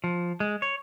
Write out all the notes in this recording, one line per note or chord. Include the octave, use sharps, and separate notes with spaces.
F3
G#3
C#5